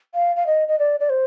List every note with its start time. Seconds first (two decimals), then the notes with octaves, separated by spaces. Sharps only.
0.14 F5
0.36 F5
0.47 D#5
0.68 D#5
0.79 D5
1.00 D5
1.09 C5